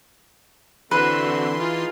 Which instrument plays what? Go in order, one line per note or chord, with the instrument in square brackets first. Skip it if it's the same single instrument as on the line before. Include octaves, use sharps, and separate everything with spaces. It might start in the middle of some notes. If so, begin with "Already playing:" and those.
[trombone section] D3 [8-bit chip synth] E3 C6 [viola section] C4 F#4 E5 [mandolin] B4
[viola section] D#4 F4 G#4